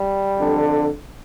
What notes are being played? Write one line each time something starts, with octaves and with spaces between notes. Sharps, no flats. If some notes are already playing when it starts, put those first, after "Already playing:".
Already playing: G3
F2 D3